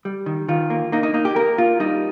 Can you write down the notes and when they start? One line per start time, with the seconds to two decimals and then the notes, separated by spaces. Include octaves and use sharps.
0.05 G3
0.26 D#3
0.48 D#3 F4
0.70 A#3
0.92 A#3 D#4
1.03 D#4
1.14 A#3 D#4
1.25 G4
1.36 A#3 A#4
1.58 A#3 F4
1.80 G3 D#4